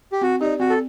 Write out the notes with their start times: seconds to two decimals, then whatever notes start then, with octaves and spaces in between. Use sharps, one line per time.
0.12 G4
0.21 C4 F#4
0.41 D#4 G4 D5
0.60 C4 F#4
0.70 A4